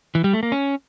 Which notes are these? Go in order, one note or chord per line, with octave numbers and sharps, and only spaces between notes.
E3
G3
A3
A#3
C#4